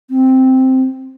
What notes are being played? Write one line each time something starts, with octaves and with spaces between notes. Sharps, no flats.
C4